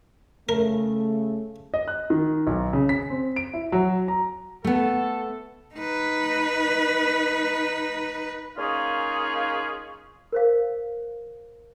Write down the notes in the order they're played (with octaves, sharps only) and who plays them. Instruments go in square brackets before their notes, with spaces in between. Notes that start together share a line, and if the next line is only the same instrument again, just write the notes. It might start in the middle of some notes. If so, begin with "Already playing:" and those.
[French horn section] C#3 A3 [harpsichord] A#4
[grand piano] D#5
F#6
D#3
B1
C#3
B6
C4
D7
E4
F#3
A#5
[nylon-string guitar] A3 B3 [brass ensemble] A4
[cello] D#4 B4
[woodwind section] A#3 C#4 D#4 F4 G#4
[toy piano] A#4 C5 F5